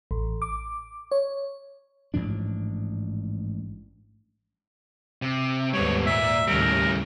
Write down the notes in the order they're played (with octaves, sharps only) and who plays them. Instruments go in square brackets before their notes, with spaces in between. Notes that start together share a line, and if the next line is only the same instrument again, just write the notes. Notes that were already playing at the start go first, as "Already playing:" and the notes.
[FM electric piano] A1
D6
C#5
[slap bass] A1 G#2 F3 D4
[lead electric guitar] C3
[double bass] D#2 G#2 [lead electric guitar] G3 B3 [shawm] C#5
[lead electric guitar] A#2 [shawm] E5
[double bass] D#2 A2 [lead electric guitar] C#3 G3 [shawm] A#4